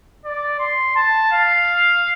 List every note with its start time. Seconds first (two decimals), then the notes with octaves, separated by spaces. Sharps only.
0.25 D5
0.60 C6
0.96 A5
1.32 F5